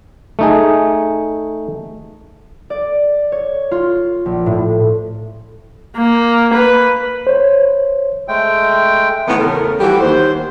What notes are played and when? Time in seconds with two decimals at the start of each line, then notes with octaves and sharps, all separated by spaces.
0.39 A3 D#4 G#4
2.70 D5
3.32 C#5
3.71 F4
4.26 A#1
4.46 A2
5.96 A#3
6.54 B4
7.27 C5 C#5
8.28 G#3 A3 G5
9.28 A2 D#3 E3 B3
9.39 E2 C#3 A3 A#4
9.80 E3 F3 G3 A3 F#4 G4
10.01 D#2 C5